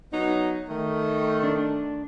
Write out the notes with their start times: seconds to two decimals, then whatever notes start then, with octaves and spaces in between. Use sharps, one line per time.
0.13 F#3 B3 D#4
0.69 D#3 A3
1.43 D4